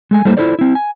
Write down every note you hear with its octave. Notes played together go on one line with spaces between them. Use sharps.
G#3 A3 G#5
G3 A3 A#3 E4 A4 C5
E4 F4 A4 C5 D5
C4 E4
G#5